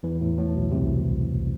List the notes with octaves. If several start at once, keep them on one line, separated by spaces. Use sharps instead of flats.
E2 E3
A2
A2
B1 B2
C2 C3